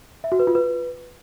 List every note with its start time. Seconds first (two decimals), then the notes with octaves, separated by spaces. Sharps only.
0.24 E5
0.32 F#4
0.39 B4
0.47 F4
0.55 B4